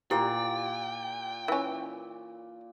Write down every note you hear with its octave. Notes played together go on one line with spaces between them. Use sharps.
A#2 E4 G4 D5 G5
E3 C#4